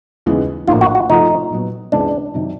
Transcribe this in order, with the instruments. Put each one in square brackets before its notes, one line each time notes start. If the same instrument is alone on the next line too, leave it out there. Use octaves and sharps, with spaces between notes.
[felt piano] D#2 C#3 E3 G#3 B3
[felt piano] A#1 A2 F3 A#3 [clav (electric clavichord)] F4
[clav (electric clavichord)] F#4
F#4
[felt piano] C3 F3 A3 C4 F4 [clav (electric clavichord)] D#4
[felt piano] A#2 F#3 B3
[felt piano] C#2 C3 E3 G#3 B3 [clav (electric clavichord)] D4
[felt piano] C3 D#3 F#3